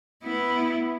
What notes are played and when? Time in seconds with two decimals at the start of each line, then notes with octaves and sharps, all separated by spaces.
0.23 B3 E4